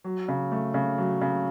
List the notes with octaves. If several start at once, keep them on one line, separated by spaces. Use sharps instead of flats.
F#3
C#3
A3
C#3
F#3
C#3